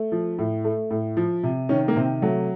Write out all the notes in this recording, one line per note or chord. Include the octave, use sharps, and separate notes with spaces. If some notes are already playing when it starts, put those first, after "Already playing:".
Already playing: A3
F3
A2
A3
A2
F3
C3
D#3 C#4
A#3
C3 C4
F#3 A3